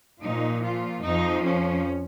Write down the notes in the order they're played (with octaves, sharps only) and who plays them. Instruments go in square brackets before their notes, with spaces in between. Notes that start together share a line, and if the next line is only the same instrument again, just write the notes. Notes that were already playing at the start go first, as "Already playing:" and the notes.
[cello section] A#2 F3 D#4
F4
F2 F3 D#4
C#4